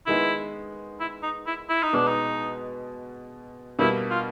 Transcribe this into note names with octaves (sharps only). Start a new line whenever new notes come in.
D#3 G#3 B3 E4
E4
D#4
E4
E4
D#4
B2 G#3 B3 D4
D#4
B2 G3 A#3 E4
F4